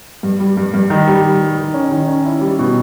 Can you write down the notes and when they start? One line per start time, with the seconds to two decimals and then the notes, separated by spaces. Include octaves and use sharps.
0.23 G2
0.40 G3
0.57 G2
0.74 G2
0.90 D#3
1.07 G3
1.24 G3
1.41 G3
1.58 D#3
1.74 C#4
1.92 D#3
2.08 C#4
2.25 E4
2.41 G3
2.59 B2